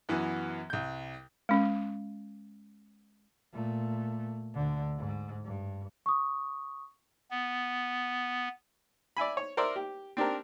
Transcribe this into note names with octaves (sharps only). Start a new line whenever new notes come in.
F#2 E3 B3 F#4
C2 G6
G#3 C#4
A#2 A3
D2 D3
G#2
G2
C#6 D#6
B3
D5 E5 G#5 B5
C#5
A#4 C5 D5 E5
G4
C4 D4 G4 A#4